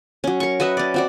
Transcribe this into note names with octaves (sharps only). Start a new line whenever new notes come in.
F#3 C#4
A#4 C#6
F#4 B4 D#5 E5
C#4 D5
C4 F#4 D5